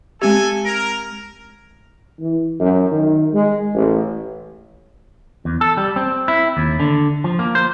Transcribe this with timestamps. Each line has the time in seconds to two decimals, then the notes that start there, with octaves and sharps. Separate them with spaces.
0.22 G#3 C4 G4 A4 G#5
0.65 A#4
2.21 E3
2.60 F#2
2.91 D#3
3.34 G#3
3.74 A1
5.45 E2
5.61 A4
5.77 G3
5.96 C4
6.28 E4
6.57 D#2
6.80 D3
7.24 F3
7.39 A#3
7.55 C5